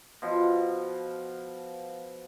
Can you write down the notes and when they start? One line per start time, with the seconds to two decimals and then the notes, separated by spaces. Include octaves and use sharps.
0.22 B2 F3